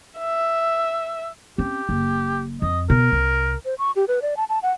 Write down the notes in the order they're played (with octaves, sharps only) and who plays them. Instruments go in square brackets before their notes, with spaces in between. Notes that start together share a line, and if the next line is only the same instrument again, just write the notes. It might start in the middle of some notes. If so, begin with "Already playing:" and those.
[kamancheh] E5
[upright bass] C4 C#4 [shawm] G4
[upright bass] F#1
[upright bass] F2 [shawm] D#5
[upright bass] B2 B3 [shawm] A#4
[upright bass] C2
[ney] C5
C#6
G4
B4
D5
A5
A5
F#5